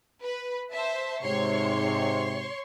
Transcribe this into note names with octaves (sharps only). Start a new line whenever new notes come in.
B4
C5 E5 A5
G#2 C3 C#5 C6 C#6